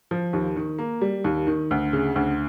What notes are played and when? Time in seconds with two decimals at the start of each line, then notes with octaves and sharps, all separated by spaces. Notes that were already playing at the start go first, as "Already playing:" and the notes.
0.11 F3
0.33 D#2
0.56 D#3
0.79 A#3
1.01 G3
1.24 D#2
1.47 D#3
1.71 D2
1.93 C#3
2.16 D2